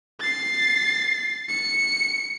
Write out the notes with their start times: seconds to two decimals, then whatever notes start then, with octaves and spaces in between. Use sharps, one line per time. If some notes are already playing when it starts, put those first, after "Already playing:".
0.20 A6 C7
1.49 C#7